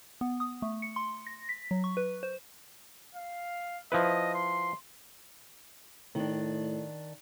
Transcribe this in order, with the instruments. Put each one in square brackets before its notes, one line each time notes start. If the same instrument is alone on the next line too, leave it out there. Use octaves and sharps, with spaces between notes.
[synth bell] B3
D#6
A3
C#7
C6
A#6
B6
F#3
C#6
B4
C5
[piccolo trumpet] F5
[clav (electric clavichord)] F3 E4 B4 [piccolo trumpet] D#5
[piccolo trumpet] C6
[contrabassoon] A2 [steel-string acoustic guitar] D#3 D4